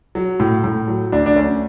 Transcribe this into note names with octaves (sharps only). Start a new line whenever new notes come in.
F#3
A2
A2
F#3
D2 D4
D4
D2 C#4